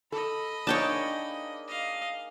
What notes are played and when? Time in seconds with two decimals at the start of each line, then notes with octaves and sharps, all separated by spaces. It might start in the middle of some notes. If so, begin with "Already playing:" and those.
0.12 A4 D#5 B5
0.67 A#3 D4 D#4 G#4 C#5 G5 A5
1.68 D#5 F5